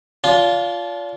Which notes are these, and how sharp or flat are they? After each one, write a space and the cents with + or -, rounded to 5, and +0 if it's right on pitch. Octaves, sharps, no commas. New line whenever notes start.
D4 -35 F4 +0